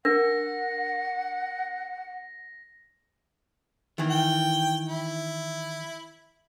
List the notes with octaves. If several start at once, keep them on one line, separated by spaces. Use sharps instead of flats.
D4 A#4 F#5 A#6
D#3 E3
G5
E4